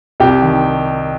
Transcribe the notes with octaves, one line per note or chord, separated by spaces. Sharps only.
C2 G4
D#3